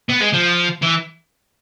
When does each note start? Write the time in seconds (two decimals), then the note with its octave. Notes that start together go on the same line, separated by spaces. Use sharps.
0.09 B3
0.20 G#3
0.33 F3
0.82 E3